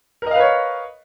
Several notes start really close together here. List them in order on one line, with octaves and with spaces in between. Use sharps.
A#4 D#5 F5 B4 C#5